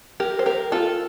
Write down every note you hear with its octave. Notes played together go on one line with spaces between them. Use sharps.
G4 A#4
C5
G4 A#4
F4 A4